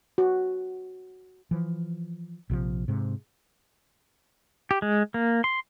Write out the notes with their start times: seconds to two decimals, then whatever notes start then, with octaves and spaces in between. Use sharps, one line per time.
0.18 F#4
1.51 E3 F3
2.50 A#1 C3 D#3 F3
2.88 G#2 C3
4.71 G4
4.82 G#3
5.14 A#3
5.44 C6